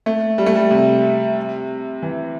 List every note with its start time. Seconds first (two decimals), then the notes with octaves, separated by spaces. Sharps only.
0.06 A3
0.38 G3
0.46 A3
0.55 G3
0.71 C3
2.02 E3